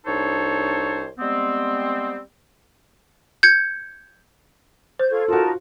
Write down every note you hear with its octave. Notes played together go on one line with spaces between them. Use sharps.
C2 D4 D#4 A4 C5 C#5
G3 G#3 B3 C4
G6 G#6 C#7
C5 G6
F4 A4 C#6 G#6
D#4 F4 F#4 A#4 A5